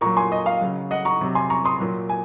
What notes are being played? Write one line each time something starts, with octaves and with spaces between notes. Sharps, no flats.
A#2 F#3 A#5 C#6
G#5 C6
D#5
F5
C#3 F#3
D#5 F#5
A#5 C#6
C3 F#3
G#5 C6
A#5 C#6
C6 D#6
A#2 F#3
G#5